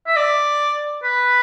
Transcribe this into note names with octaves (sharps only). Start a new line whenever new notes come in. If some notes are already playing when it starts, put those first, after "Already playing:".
E5
D5
B4